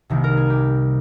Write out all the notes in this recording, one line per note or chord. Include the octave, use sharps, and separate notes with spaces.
C2 C3 D#3 A#3
A#4
G#4
G4